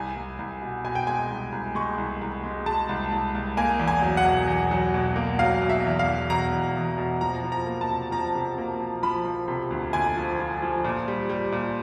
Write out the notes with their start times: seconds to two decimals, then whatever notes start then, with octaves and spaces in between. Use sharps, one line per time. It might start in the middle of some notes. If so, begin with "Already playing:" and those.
Already playing: C2 G#5
0.16 C2
0.39 C2
0.62 B2
0.84 B2 G#5
0.95 G5
1.07 G#3 G#5
1.30 C2
1.52 C2
1.75 G#3 C#6
1.98 C2
2.21 C2
2.44 G#3
2.66 G#3 A5
2.89 C2
3.12 C2
3.35 C2
3.57 A#3 G#5
3.79 E2
3.88 G#5
4.02 F#3
4.17 F#5
4.25 B2
4.48 E2
4.71 F#3
4.94 B2
5.16 A#3
5.39 F#3 F5
5.62 B2
5.69 E5
5.85 E2
5.99 F5
6.07 E2
6.30 B2 A#5
6.53 E2
6.76 E2
6.98 B2
7.21 F3 A#5
7.44 F3
7.52 A#5
7.66 A#3
7.81 A5
7.89 C3
8.11 F3 A#5
8.35 C3
8.58 A#3
8.80 F3
9.03 F3 B5
9.25 F3
9.48 C3
9.70 D2
9.93 D2 G#5
10.17 F3
10.39 F3
10.62 F3
10.85 A#2
11.08 G3
11.30 G3
11.52 A#2